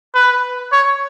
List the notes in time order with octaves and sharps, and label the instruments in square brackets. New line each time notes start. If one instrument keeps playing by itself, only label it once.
[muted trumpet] B4
C#5